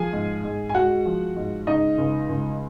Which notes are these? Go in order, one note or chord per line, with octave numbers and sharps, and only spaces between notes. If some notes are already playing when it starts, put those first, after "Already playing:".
Already playing: F3 G#4 G#5
G#2
G#2
G#5
G#3 F#4 F#5
F3
G#2
C#3 D#4 D#5
C#2
C#2